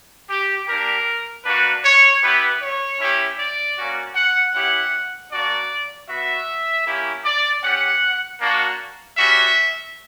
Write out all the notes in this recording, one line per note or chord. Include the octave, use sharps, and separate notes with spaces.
G4
A#3 D4 G4 A#4
A#3 D4 F#4 B4
C#5
B3 E4 G4 B4
C#5
C#4 E4 G4
D5
A#3 C#4 F#4
F#5
C#4 E4 G4 F#5
A#3 D4 F#4 D5
B3 F#4 E5
A#3 C#4 E4 G4
D5
C#4 G4 F#5
A#3 D4 F#4
G3 C#4 F#4 E5